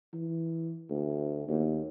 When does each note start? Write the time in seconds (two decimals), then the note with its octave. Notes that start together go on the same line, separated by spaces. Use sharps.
0.13 E3
0.90 D2
1.48 D#2